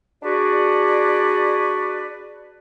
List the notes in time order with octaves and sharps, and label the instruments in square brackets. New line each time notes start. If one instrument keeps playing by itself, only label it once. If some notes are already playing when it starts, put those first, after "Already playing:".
[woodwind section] D4 F#4 G#4 B4 D5